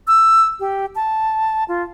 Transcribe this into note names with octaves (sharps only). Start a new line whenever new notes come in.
E6
G4
A5
F4